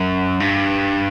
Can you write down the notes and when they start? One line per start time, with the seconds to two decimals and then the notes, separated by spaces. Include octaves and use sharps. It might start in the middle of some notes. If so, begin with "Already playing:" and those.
Already playing: F#2
0.40 G2